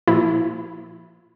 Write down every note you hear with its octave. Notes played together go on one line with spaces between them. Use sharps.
A#2 F3 E4